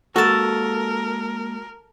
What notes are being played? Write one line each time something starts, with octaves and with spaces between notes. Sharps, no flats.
G#3 A#3 F#4 A4 A#4 A5